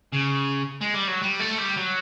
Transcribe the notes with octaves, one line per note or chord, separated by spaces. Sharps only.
C#3
G#3
G3
F#3
G3
A3
G3
F#3